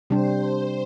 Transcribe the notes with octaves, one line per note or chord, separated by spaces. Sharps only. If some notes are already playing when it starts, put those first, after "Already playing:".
C3 G3 D4 G4 C5